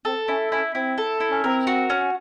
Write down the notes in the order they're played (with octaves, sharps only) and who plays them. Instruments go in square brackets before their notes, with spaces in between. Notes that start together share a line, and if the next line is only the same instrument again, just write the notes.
[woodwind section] C4 [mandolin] A4
[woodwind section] C#4 [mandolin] E4
[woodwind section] C#4 [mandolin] E4
[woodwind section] C4 [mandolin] E4
[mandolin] A4
E4
[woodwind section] C#4
[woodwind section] C4 [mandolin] A#4
[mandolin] F#4
C#4